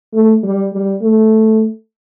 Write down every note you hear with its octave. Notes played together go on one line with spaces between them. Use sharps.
A3
G3
G3
A3